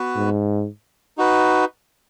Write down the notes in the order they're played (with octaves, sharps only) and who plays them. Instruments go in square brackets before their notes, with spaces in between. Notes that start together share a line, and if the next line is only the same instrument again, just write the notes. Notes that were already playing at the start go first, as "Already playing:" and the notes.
Already playing: [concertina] B3 F#4 B4
[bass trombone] G#2
[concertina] D#4 F#4 B4